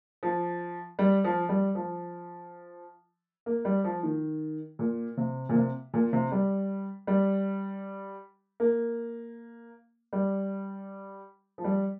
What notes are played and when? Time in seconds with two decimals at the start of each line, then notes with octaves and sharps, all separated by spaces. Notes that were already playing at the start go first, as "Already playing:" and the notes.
0.23 F3
0.99 G3
1.24 F3
1.49 G3
1.75 F3
3.46 A#3
3.65 G3
3.84 F3
4.03 D#3
4.79 A#2
5.17 C3
5.49 A#2
5.55 C3
5.94 A#2
6.13 C3
6.32 G3
7.07 G3
8.60 A#3
10.13 G3
11.58 F3
11.64 G3